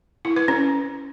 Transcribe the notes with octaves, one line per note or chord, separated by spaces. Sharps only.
E4
B4
C#4